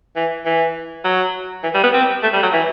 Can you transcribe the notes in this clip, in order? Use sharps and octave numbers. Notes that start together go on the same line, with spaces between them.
E3
E3
F#3
E3
G3
B3
C4
A3
G3
F#3
E3